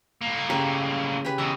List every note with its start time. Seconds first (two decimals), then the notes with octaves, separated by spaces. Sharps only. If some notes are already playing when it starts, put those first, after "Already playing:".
0.21 A2 A#3
0.50 C#3 G4 A#4
1.25 G4 G#4 B4
1.38 B2 E3 A#5